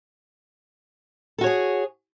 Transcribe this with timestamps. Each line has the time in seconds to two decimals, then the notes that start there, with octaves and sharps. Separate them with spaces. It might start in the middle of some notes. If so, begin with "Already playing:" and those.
1.38 A4
1.41 F#4
1.44 C#5
1.46 G#4